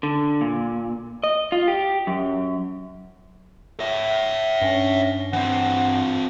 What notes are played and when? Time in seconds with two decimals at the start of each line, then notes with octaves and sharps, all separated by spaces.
0.03 D3
0.41 A#2
1.23 D#5
1.52 F4
1.68 G4
2.07 F#2
3.80 C#5 E5
4.62 G2 C#4
5.33 E3 C4 F#5